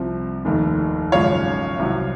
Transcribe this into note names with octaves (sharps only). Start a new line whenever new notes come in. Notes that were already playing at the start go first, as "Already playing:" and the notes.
Already playing: C2 C3 F3
F1 D#2 D#3
G#1 F#2 C#3 F3 C#5 F5
C2 C3 F#3